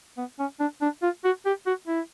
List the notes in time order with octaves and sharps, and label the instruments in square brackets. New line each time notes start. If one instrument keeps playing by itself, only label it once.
[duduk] B3
C#4
D4
D4
F4
F#4
G4
F#4
E4